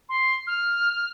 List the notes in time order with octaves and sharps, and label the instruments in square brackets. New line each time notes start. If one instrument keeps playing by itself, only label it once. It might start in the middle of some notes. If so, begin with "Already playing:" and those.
[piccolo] C6
F6